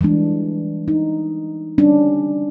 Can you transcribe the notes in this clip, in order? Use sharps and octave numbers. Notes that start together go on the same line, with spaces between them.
E3 G3 G#3 D4
D#4
G3 C#4 D4